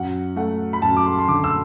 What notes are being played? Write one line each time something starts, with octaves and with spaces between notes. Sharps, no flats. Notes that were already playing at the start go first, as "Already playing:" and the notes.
Already playing: F#2 F#5
A3 F#5
B5
F#2 A5
D6
C6
C6
D3 D6
E6